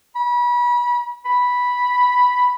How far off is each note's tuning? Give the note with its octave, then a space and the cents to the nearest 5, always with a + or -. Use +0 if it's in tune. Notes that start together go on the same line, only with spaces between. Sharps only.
B5 -30
B5 -5